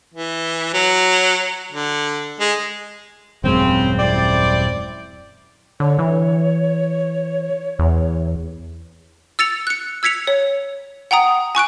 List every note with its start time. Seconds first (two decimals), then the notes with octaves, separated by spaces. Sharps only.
0.14 E3
0.74 F#3
1.73 D3
2.40 G#3
3.44 D#1 F#2 C#3 G#3 C4
3.99 C4 E4 D5
5.80 D3 C#5
5.99 E3
7.79 E2
9.39 E6 A6 C#7 F7
9.67 F#6 C#7
10.03 E6 G#6 B6 C#7 F7
10.27 C#5
11.11 F#5 G5 A#5 D#6
11.55 G#5 C#6 F#6 D7